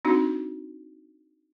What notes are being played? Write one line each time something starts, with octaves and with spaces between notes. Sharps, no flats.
C4 D4 D#4 F#4